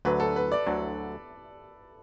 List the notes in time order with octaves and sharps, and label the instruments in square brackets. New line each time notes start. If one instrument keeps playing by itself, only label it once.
[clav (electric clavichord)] D2 D3 F#3 [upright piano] B4
[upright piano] A4
B4
D5
[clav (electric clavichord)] D2 D3 F#3